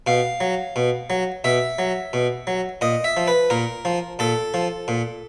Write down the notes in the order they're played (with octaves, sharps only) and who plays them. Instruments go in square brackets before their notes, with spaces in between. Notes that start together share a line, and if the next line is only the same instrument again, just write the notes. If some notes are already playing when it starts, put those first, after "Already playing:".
[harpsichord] B2 F5
F#3
B2
F#3
B2 E5
F#3
B2
F#3
A#2 D#5
E5
F3
B4
A#2 A#4
F3
A#2 A4
F3
A#2